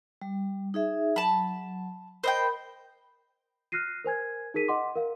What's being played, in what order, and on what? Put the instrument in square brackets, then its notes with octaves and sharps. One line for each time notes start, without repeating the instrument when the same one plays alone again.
[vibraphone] G3
D#4 G#4 E5
[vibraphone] F#3 [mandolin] A5 B5
[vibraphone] A#4 B5 [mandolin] C5 D#5 G5
[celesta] F6 F#6 A#6 C7 D#7
A#4 C5 G#5 G#6
D#4 G#4 A#4 B6 D#7
D#5 F#5 C6 D6
A#4 F5